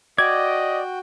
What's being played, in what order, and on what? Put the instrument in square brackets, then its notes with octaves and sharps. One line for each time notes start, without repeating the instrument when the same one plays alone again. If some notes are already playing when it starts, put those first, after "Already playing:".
[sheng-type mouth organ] F#4 G5 [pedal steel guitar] D5 [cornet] D#5 [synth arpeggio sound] G#6